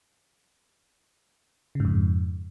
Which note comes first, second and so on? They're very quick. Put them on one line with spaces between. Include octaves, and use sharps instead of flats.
C#3 G#2 F2